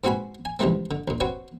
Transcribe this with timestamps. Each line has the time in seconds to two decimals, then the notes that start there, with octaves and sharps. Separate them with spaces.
0.04 G#2 C4 F#4 B4 G#5 B5
0.45 G#5
0.59 C#2 E3 F3 G3 A3 C4
0.91 D3
1.08 D2 A#2
1.20 C4 F#4 B4 C#5